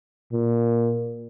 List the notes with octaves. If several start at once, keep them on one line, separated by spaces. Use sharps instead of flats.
A#2